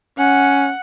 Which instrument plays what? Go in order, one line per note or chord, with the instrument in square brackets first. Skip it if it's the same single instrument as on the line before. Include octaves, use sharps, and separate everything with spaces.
[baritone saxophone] C#4 [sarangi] F#5